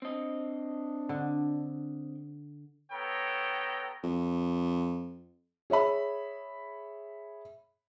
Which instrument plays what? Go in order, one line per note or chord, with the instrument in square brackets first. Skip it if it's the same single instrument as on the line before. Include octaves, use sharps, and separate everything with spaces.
[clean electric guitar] C4 D#5 [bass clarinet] D4
[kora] D3
[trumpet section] B3 A4 C#5 G5 A#5
[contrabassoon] F2
[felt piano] G#4 C#5 E5 B5